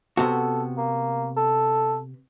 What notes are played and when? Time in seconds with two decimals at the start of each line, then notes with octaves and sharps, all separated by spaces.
0.17 C3 B3 F#4 A4
0.78 A#3
1.37 A4